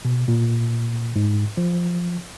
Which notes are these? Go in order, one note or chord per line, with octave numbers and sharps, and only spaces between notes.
B2
A#2
G#2
F3